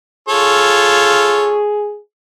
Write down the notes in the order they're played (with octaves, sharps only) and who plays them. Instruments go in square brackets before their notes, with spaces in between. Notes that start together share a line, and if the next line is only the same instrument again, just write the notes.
[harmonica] F4 A4 C#5 [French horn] G#4